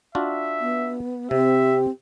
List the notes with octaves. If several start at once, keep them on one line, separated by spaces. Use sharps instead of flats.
D4 F4 F#4 E5
B3
C3 C4 G4 E5